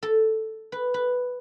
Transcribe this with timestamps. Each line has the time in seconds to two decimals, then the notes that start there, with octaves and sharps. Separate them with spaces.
0.03 A4
0.72 B4
0.94 B4